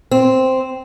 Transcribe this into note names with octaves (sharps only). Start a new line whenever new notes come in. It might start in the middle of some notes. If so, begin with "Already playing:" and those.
C4